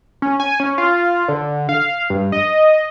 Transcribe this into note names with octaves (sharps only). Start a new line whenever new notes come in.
C#4
G#5
C#4
F4
D3
F5
G2
D#5